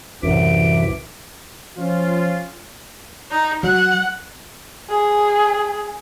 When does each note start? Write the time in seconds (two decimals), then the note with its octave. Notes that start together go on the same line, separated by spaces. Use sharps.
0.23 C2 F#2 A2 E3 E5 D6
1.77 F3 C#4 F4
3.31 D#4
3.63 F#3 F#5
4.89 G#4